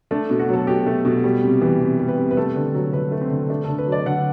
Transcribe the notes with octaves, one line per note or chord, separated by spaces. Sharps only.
A3 D4
B2
F#4
F#3 A4
B2 G4
A3
B2
G3
C3
E3
C3
G3
B4
C3
B4
A3 A4
D3
F#3
D3 B4
A3
C4
D3
A3 D4
D3 A4
B4
F#3
D5
D3 F#5